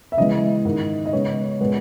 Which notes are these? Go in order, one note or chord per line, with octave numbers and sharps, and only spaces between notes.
E5
C#3 E3 G#3 B3 D#5
G#2 D#3 A#3
D#5
C#3 G#3 B3 C#5
A#2 G#3 B3